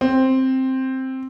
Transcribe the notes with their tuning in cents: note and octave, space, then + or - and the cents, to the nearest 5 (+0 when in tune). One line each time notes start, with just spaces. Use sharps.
C4 +5